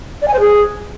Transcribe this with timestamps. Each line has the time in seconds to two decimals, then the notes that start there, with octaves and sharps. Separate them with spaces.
0.22 D5
0.28 G#5
0.34 C5
0.40 G#4